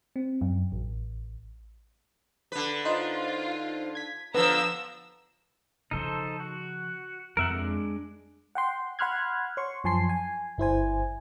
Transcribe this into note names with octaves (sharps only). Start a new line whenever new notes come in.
C4
F#2
A1
D3 B4
D#4 F4 C5
G#6 B6
D3 F3 B3 A#5 E6
C#3 F3 D#4 A4 C5
F#4
F2 A#4 E5 F#5
G#3 D4
F#5 G5 C6
F#5 B5 C6 F6 F#6 G#6
C#5 C6 C#6
F#2 F3 G#5 A5 C6 C7
G#5
G1 E4 C5 G#5